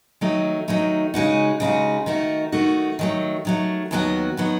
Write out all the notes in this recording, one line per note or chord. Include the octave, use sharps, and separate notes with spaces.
D#3 F#3 A3 D#4
D#3 F#3 A3 D#4
C#3 G#3 D#4 F#4
C#3 G#3 D#4 F#4
D#3 A3 D#4 F#4
D#3 A3 D#4 F#4
D#3 F#3 A3
D#3 F#3 A3
D#2 D#3 F#3 B3 F#4
D#3 F#3 B3 F#4